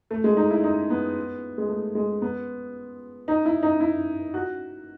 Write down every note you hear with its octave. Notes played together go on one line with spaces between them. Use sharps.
A3
G#3
D#4
E4
D#4
B3
G#3
A3
G#3
B3
D#4
E4
D#4
E4
F#4